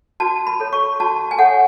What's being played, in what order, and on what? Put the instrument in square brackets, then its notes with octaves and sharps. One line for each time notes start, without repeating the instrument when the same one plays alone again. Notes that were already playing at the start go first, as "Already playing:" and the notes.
[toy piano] F#4 A5
B5
A4 C#5
C#6
F#4 A5
G#5
A4 C#5 F#5